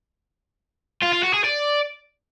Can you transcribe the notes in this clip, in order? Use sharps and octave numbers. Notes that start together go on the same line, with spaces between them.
F4
F4
F#4
G#4
D5